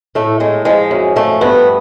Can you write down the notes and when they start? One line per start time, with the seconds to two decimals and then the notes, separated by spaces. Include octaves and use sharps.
0.15 A2 A3
0.40 A2 G#3
0.65 F3 G#3
0.91 F#2
1.16 F3 A3
1.41 G2 B3